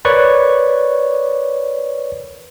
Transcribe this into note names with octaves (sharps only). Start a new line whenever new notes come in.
A#4 B4 C#5 D5 C#6